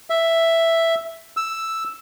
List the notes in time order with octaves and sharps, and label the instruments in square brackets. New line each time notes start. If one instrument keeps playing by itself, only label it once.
[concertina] E5
E6